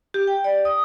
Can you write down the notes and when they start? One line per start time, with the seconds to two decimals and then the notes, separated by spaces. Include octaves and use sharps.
0.14 G4
0.27 G5
0.44 D5
0.65 D#6